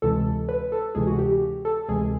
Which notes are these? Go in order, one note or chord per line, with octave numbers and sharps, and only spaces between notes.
D2 C3 E3 G#3 A4
B4
A4
D2 C3 E3 G#3 G#4
F#4
G4
A4
D2 C3 E3 G#3 G#4